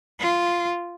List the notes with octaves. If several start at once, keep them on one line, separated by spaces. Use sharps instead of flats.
F4